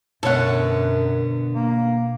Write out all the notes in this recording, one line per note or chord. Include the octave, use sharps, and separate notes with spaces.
F#2 B2 D3 B3 A4 C#5 F#5
A#3